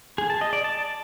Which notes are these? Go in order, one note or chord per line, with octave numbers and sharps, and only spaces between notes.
G#4
A5
D#5
D5
A5